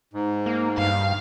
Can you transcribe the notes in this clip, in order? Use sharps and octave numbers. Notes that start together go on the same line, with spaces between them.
G#2
A#3
G2 F5